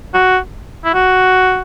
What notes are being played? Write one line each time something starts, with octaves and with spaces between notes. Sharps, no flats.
F#4
E4
F#4